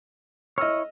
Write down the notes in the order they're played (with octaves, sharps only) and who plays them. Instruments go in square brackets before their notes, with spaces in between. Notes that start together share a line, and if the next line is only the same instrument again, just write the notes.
[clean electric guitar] E4 C#5 [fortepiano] D#5 E6 F6